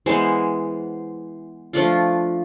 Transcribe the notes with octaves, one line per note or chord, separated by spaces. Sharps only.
E3 G#3 B3 E4 C5
F3 A3 D4 F4